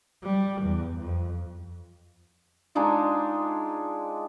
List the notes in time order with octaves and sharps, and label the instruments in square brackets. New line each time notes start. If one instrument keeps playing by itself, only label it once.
[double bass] G3
E2
F2
[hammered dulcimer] G#3 D4 D#4 F4